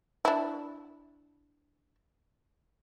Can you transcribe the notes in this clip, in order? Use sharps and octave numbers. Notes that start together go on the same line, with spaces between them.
D4 E4